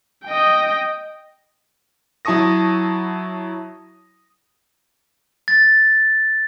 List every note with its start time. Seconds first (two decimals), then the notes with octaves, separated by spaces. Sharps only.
0.25 D#5 G5
2.25 F#3 E4 A5 C#6 D#6 A#6
5.48 A6